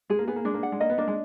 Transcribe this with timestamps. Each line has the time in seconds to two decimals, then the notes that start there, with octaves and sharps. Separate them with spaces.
0.10 G#3 G#4
0.19 A#3
0.27 B3 G#4
0.36 A#3
0.45 G#3 D4
0.54 A#3
0.63 F#5
0.72 G#3
0.80 A#3 D#5
0.90 B3
0.98 A#3 D4
1.08 G#3